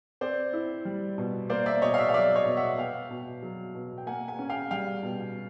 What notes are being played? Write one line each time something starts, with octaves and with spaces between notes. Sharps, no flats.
C4 C5 D5
E4
G3
B2
A#3 C5 D5
D5 E5
B2 C#5 D#5
F5
D5 E5
F5
F#3 D5 E5
C#5 D#5
B2
E5 F#5
B3 F5 G5
B2
F#3
B2
G5
A#3 F#5 G#5
F#5 G#5
C#4
F5 G5
G3 F5 G5
B2